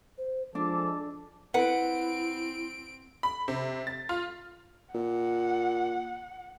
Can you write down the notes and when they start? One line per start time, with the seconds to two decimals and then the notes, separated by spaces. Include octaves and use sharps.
0.18 C5
0.55 F3 G#3 D4 A4 D6
1.54 C4 E4 B4 F#5 D7
3.23 B5
3.48 C3
3.87 A6
4.09 F4
4.95 A#2 F#5